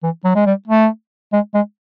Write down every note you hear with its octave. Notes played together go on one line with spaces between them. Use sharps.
E3
F#3
G#3
G3
A3
G#3
G#3